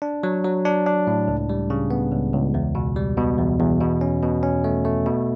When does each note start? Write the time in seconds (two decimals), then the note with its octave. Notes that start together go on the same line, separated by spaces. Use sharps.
0.02 D4
0.23 F#3
0.44 F#3
0.65 D4
0.86 D4
1.07 A2
1.28 C#2
1.49 G3
1.70 C#3
1.91 B3
2.12 C#2
2.33 C#2
2.54 E2
2.75 B2
2.96 G3
3.18 B2
3.38 E2
3.59 E2
3.80 B2
4.01 C#4
4.23 B2
4.43 C#4
4.64 A3
4.85 A3
5.07 B2